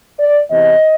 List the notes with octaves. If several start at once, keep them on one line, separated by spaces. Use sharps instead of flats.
D5
E2 C3 E3 D#5